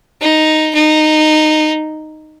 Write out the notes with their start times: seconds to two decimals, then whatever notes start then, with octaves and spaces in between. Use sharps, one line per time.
0.21 D#4
0.75 D#4